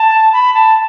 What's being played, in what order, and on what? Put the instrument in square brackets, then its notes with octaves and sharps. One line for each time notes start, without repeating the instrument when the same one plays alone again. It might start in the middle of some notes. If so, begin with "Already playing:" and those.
Already playing: [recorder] A5
B5
A5